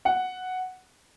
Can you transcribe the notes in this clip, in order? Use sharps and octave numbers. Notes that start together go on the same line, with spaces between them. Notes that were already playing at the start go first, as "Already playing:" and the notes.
F#5